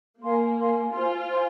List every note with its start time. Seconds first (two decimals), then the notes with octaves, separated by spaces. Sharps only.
0.22 A#3 A#4 F5 G#5 C6
0.58 A#4 F5 G#5 C6
0.93 F4 C5 G#5 C6
1.29 C5 G#5 C6